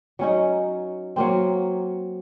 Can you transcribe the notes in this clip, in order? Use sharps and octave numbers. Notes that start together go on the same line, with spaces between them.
F#3 C#4 D#4
F#3 A#3 C4